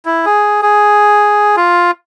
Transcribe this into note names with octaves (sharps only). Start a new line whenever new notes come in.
E4
G#4
G#4
F4